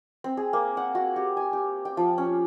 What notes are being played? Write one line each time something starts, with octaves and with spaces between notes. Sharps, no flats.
C4
G#4
A#3
F#5
F#4
G4
G#5
G4
G5
F3
C#4